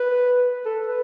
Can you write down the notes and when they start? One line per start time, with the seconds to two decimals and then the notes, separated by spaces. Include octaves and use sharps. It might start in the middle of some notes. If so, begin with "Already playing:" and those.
Already playing: B4
0.65 A4
0.87 B4